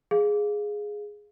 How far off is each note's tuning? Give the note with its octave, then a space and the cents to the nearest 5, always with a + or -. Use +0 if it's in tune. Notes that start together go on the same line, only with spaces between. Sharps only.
G#4 +0 F5 +0